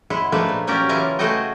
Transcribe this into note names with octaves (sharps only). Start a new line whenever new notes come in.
G#3 E4 F#5
F3 A3 A#3 D4 B4
A#2
F#3 C#4 G4 A#4 D5
C#3 E3 E4 F4 G#5 A#5
A3 F#4 G#4 A4 D#5 G5